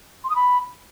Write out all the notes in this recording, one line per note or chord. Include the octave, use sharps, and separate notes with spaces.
C6
D#6
B5